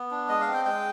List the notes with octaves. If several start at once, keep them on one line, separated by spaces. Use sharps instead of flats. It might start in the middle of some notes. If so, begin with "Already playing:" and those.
Already playing: B3
D4
G#3 D#5
F5
C4
G5
G#3 G5